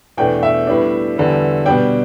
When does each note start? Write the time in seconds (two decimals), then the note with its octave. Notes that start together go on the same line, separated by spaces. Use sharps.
0.17 E2 B2 A3 D4 G5
0.43 E5
0.67 A2 G3 B3 D4
1.16 E2 D3 G3 B3
1.65 B2 G3 D4 G5